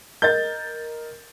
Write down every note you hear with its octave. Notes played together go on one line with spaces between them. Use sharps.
A#4 D#5 G6 A6